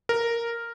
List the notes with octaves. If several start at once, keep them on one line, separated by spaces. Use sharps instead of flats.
A#4